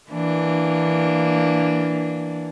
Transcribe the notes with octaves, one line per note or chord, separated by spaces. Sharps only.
E3 A#3 D4